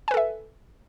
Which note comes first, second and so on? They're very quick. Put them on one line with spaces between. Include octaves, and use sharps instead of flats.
G#5 B4 A4 E5